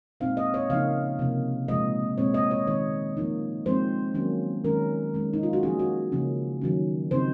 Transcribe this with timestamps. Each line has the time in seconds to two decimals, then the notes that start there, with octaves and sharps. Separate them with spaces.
0.21 A#2 G#3 C4 D#4 F5
0.37 D#5
0.54 C#5
0.70 C#3 F3 A#3 D#4 F5
1.19 C3 F3 A#3
1.68 A#2 F3 G#3 D#5
2.18 A#2 G#3 C4 C#5
2.34 D#5
2.51 C#5
2.67 D#3 G#3 C4 C#5
3.17 F3 A#3 D#4
3.66 F3 G#3 C4 D#4 C5
4.14 D#3 F#3 A#3 C#4
4.64 D#3 G#3 C#4 A#4
5.14 D#3 G#3 C#4
5.33 D#4
5.43 F4
5.53 F#4
5.63 F3 A#3 C#4 G#4
5.79 F#4
6.12 C#3 F3 A#3 C#4
6.62 D#3 F#3 C#4
7.11 C#3 F3 C4 D#4 C5